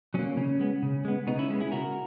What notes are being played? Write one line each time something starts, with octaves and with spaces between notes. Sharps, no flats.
F#3 A#3 C#4
C#3 C#4
G#3 B3
C#3
G#3 B3
C#3 B3 D#4
C#4 E4
G#3 B3 C#4 E4
E4 G#4
C#3 F#4 A#4